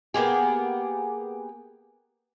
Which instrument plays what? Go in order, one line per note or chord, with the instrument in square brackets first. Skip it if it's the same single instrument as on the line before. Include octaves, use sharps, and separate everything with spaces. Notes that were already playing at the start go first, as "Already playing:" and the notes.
[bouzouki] A#3 B3 G4 G#4